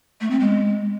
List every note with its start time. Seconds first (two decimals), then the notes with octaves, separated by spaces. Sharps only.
0.21 A3
0.30 C4
0.40 G#3